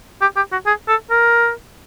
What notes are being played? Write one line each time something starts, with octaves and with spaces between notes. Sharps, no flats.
G4
G4
F#4
G#4
A4
A#4